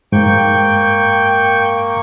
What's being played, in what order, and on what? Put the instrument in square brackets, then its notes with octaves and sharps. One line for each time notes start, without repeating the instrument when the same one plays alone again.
[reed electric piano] G#2 [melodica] A#3 C#6 [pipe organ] G5